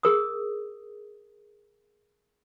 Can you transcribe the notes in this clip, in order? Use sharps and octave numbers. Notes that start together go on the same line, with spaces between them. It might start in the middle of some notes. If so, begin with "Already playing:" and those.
G#4 A#4 D#6